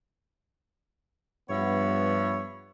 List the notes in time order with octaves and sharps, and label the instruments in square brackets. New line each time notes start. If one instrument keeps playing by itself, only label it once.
[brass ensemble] G2 B3 [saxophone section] F3 C#5 E5